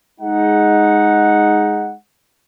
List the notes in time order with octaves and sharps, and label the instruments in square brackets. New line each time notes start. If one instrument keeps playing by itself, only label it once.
[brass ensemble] G#3 D#4 F#5